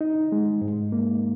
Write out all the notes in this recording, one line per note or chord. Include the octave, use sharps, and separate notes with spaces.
D#4
G#3
G#2
A#3